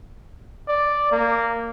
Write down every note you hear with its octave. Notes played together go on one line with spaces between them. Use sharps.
D5
A#3